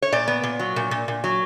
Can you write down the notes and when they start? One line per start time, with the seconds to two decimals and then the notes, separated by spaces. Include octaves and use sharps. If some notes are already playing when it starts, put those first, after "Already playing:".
0.02 C#5
0.12 A#2 D5
0.28 B3
0.43 A#2
0.59 F#3
0.76 A#2
0.91 A#2
1.08 A#2
1.24 F#3